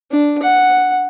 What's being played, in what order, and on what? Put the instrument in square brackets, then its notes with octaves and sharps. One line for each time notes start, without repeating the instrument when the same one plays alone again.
[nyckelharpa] D4
F#5